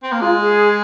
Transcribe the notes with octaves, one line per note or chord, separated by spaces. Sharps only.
C4
A#3
G#3 F4
G#4